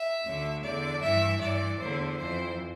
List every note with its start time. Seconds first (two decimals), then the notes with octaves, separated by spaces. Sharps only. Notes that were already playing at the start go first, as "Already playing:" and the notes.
Already playing: E5
0.24 D2 D3
0.63 E2 D3 D5
1.01 G2 E3 E5
1.40 G2 E3 D5
1.79 E2 D3 C5
2.17 F2 E3 C5